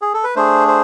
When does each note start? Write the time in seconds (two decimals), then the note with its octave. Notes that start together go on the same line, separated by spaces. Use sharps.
0.02 G#4
0.14 A4
0.24 B4
0.36 A3 D4 G#4 C5
0.68 C5